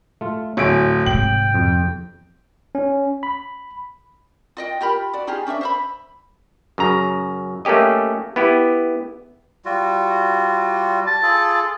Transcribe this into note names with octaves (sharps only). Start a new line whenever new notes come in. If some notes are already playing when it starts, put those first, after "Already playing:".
A3 F4
D1 C#5 E5 G#5 D7
G#2 C3 G5 F#7
F2
C#4
B5
F4 D#5 G5
F4 G4 A#4 B5
F#4 D5
D#4 F4 G4 G#4
C#4 D4 D5 E5
C5 E5 B5
F#2 C#3 A#5
A3 A#3 C#4 G4 D#5
B3 E4 G4
G3 F4 F#4
A5
F4 G#4 A4